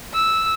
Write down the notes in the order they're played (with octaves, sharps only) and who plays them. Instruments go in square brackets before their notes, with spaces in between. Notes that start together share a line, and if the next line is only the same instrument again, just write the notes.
[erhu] E6